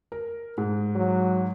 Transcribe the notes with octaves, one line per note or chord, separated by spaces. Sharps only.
A#4
G#2
F#3